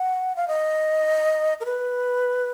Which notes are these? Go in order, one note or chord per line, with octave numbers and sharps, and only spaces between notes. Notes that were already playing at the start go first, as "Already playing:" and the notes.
Already playing: F#5
F5
D#5
A#4
B4